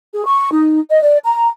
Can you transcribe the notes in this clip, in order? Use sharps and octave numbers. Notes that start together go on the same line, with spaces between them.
G#4
C#6
D#4
D#5
D5
A#5